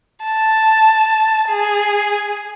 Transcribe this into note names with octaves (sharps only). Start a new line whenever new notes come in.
A5
G#4